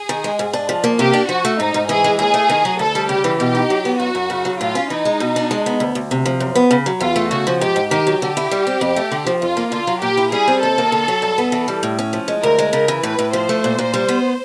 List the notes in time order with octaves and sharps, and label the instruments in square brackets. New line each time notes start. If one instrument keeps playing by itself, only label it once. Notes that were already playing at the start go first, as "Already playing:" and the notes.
Already playing: [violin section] G#4
[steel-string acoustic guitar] D#3
G#3
G#2
D4
F3
A#3
[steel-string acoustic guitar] C3 [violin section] G4
[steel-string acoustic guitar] D4
[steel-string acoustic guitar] F3 [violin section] F#4
[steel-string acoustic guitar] A3
[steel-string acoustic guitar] G#2 [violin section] D#4
[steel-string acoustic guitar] G#2
[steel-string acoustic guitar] E3 [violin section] G#4
[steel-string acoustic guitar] G#3
[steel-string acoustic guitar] D#2 [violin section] G#4
[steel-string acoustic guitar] A3
D#3
F#3
[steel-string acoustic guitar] D2 [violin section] A4
[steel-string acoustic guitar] G3
[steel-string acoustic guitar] C#3 [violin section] G4
[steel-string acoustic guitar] E3
[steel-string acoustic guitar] B2 [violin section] G4
[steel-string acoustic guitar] D#4
F#3
B3
[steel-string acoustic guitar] F#2 [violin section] F#4
[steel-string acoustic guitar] F#2
C#3
F#3
[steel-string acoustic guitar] A2 [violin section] F4
[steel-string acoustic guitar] C#4
[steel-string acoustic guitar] E3 [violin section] D#4
[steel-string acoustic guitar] G#3
B2
D4
G#3
B3
D2
D2
C3
F3
F#2
B3
C#3
F#3
[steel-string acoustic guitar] E2 [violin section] F4
[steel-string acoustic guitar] A3
[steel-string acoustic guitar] C#3 [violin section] F#4
[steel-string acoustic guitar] F3
[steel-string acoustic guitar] G#2 [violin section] G4
[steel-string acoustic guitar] G#2
[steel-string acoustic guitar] D#3 [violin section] G4
[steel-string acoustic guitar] F#3
[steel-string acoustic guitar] D3 [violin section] G4
[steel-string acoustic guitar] E4
G3
C4
F2
A3
D3
F3
[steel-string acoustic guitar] F2 [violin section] F4
[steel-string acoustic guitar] A#3
[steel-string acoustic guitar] D3 [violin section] F4
[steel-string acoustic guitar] F#3
[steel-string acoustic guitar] A#2 [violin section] G4
[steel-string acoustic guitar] E4
[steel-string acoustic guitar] G3 [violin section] G#4
[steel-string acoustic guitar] C4
[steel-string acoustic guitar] D#2 [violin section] A4
[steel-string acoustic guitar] A#3
D3
F#3
G2
B3
E3
G3
A2
C#4
F3
G#3
[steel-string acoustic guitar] D2 [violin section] A#4
[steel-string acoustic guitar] G#3
[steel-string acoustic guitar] C#3 [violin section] A#4
[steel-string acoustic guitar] E3
[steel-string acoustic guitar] A2 [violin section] B4
[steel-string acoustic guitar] A2
[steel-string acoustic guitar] F3 [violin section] C5
[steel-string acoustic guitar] A3
A#2
A#2
G3
B3